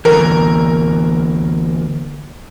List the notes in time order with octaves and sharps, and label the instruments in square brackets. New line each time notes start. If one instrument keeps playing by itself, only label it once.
[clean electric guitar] D2 G2 E3 [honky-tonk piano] A#4